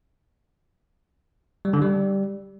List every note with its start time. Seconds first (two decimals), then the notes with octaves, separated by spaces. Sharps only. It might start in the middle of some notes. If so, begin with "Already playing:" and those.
1.65 G3
1.73 D3
1.82 G3